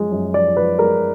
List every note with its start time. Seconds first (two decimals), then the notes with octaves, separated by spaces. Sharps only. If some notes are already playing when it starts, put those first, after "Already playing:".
Already playing: F#2 F3 G#3
0.12 F#2
0.34 F3 D5
0.57 F3 B4
0.79 G#3 A#4